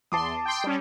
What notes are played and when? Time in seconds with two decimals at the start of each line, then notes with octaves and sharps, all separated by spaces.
0.12 E2 A5 C6 D6 D#6
0.45 G5 C6
0.64 G3 C#4